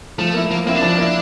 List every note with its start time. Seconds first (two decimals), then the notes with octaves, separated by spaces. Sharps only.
0.18 F3 A3
0.34 A#3 E4
0.51 F3 A#3
0.66 A#3 C4 E4
0.75 D4
0.82 F3
0.98 A#3 E4